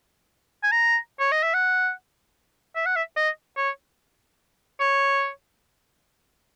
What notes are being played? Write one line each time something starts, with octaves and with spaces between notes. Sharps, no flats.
G#5
A#5
C#5
D#5
E5
F#5
E5
F#5
E5
D#5
C#5
C#5